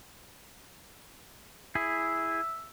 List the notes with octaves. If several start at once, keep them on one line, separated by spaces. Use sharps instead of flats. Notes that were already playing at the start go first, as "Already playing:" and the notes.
E4 G#4 E5